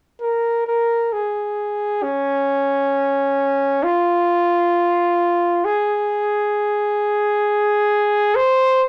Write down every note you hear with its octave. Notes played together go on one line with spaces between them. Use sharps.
A#4
A#4
G#4
C#4
F4
G#4
C5